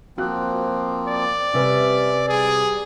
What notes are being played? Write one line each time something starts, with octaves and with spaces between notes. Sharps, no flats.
F3 A#3 C4 F#4 F#6
D5
C3 G3 C#4 B4 E5
G3 G#4